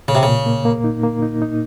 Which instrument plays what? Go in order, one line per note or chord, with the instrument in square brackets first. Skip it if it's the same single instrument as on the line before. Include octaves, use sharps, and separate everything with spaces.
[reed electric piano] A#2 [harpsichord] C#3
[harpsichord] C3
[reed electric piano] A#2 [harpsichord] C#3
[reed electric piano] A#3
A#3
D#4
A#3
D#4
D#4